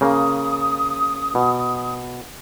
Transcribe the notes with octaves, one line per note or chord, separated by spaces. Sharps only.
C#3 A#3 D#6
B2